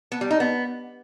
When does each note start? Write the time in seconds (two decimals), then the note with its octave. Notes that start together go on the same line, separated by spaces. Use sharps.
0.12 B3
0.21 G3
0.31 D#4
0.40 B3